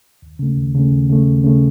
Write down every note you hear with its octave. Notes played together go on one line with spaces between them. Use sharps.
D#2
C#3 A3
D#2
C#3 A3
D#2
C#3 A3
D#2
C#3 A3